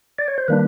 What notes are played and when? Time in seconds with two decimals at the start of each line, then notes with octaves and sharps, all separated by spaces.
0.18 D5
0.28 C#5
0.38 C5
0.48 D#3 G3 A#3 D4 B4